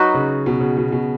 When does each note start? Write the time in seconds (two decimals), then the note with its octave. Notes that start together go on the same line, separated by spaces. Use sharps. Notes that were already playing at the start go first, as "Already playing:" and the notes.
Already playing: F#3 D#4 F#4 B4
0.14 C#3
0.46 B2
0.61 C#3
0.77 B2
0.92 B2